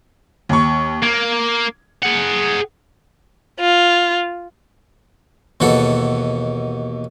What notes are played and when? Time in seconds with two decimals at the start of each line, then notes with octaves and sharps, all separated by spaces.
0.49 D#2 C#6
1.03 A#3 G#6
2.02 G#4 F#5
3.60 F4
5.60 D#2 B2 E3 A4 F#5